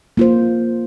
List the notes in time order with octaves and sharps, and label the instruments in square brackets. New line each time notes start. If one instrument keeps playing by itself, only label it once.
[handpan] A#3 F4 C5